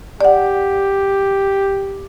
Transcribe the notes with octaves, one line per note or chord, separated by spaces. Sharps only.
G4 D5 F#5